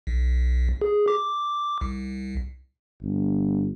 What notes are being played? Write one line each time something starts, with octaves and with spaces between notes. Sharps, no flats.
B1
G#4
D6
C2
G1